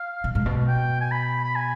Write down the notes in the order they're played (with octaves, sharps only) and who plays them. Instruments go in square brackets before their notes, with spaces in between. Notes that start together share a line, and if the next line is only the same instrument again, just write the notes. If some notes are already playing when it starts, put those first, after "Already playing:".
Already playing: [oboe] F5
[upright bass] B2
G#2
B2
[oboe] G5
G#5
B5
B5
G#5